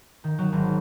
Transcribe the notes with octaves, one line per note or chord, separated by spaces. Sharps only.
D#3
F#3
G#1